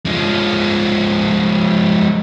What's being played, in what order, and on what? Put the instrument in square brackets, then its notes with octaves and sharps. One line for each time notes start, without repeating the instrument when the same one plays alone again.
[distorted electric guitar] F3 G#3